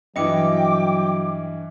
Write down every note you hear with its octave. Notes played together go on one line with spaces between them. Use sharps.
G2 E3 F#3 E4 D#5 G5 D6 C#7